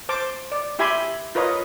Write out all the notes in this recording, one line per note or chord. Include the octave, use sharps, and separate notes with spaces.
C5 A5 D6
D5
E4 G4 E5 G#5 B5 C6
F4 A#4 B4 C#5 D#5